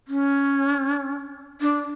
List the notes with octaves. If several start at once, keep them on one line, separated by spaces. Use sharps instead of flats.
C#4
D4